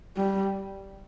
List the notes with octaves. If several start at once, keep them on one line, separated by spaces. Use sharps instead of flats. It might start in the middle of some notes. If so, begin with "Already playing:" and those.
G3